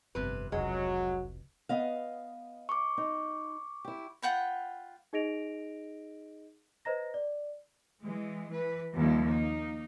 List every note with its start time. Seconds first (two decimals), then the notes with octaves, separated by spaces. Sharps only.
0.15 G1 F2 C3 B4
0.52 F1 C#2 F#3 G#3
1.69 B3 D#5 F5
2.69 C#6 D6
2.98 D#4
3.85 E4 G4
4.22 F4 F#5 G5 B5
5.13 D#4 G#4 D#5 A#6 D7 F7
6.85 B4 C5 D#5 A#5 A#6
7.14 D5
8.04 E3 G#3
8.51 E3 B4
8.95 D#2 F3 G3 E4
9.25 A#3 D#4